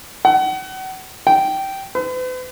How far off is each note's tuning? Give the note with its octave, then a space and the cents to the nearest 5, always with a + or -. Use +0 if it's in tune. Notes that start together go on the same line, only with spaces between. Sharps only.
F#5 +35
G5 -15
B4 +45